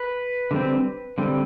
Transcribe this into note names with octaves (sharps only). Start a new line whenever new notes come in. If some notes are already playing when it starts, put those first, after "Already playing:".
Already playing: B4
D3 G3 C4
D3 G3 C4